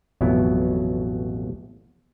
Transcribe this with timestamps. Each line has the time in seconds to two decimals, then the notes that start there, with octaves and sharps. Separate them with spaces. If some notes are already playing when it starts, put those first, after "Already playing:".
0.21 A1 F2 B2 F#3 B3 E4